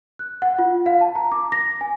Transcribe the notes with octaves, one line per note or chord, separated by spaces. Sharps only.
F#6
F#5
F4
F5
A5
A#5
D6
A#6
G#5